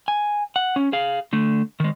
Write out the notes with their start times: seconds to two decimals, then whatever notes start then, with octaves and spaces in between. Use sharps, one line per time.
0.08 G#5
0.56 F#5
0.76 C#4
0.93 G#4 F5
1.33 D3 A3
1.80 D#3 G#3